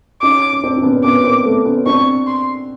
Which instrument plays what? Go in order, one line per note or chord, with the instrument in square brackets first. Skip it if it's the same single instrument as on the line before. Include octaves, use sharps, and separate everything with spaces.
[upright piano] C#4 D#4 [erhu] D6
[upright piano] C#4
C4 D4
D4
B3 C#4
[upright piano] B3 C#4 [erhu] D6
[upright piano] A#3 C4
A3 B3
B3 C#4
[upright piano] C4 D4 [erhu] C#6
[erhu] C6